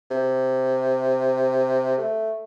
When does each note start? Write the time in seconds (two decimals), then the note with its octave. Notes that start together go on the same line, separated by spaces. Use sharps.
0.11 C3
1.98 A3